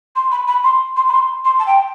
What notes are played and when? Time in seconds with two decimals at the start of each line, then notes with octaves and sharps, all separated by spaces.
0.16 C6
0.31 B5
0.47 B5
0.64 C6
0.96 C6
1.08 B5
1.12 C6
1.44 C6
1.59 A5
1.66 G5